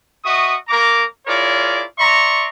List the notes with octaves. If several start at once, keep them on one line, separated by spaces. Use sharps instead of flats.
F#4 D#5 E5 C#6 D#6
A#3 A#4 C#5 A#5 D6
E4 F4 G#4 A#4 C#5 D5
D5 E5 A#5 C6 C#6